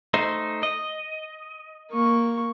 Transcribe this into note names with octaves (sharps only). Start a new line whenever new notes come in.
A3 D#4 C5
D#5
A#3 C#6